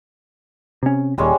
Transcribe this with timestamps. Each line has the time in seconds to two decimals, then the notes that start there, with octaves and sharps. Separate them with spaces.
0.83 C3 C#4
1.18 D#1 D#2 G3 G#3 C#4